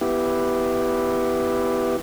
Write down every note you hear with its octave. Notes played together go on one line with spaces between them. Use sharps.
B3 E4 G4